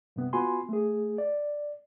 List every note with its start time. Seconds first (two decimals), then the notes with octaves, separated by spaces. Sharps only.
0.16 G2 C3 B3
0.33 B3 F4 F#4 G#5 B5 C6
0.69 A3 G#4
1.18 D5